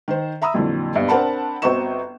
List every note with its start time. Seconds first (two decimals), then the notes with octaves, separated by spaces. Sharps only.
0.08 D#3 C5
0.42 E5 A#5 B5 D#6 E6
0.54 F2 A#2 D3 E3 F#3
0.95 G2 B2
1.09 C4 D4 A#4 F#5 A5 B5
1.62 G1 C4 F#4 D#5 C#6 E7